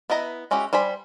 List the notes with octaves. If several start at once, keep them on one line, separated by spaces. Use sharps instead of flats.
B3 E4 D#5 A#5
G#3 C#4 E4 F#4 G4
G3 C5 G#5 B5